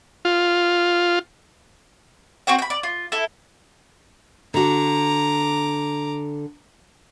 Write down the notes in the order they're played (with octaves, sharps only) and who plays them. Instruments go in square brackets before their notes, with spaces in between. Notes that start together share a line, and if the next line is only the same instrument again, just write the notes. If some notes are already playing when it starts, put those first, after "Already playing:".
[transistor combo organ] F4
[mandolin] C4 F#4 C5 G5
G5 B5
D5
F4
E4 A4
[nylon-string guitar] D3 F#4 [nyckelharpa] A#5 D6